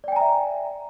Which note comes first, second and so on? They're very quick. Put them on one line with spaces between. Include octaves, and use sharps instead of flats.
D5 G5 G#5 A#5 E5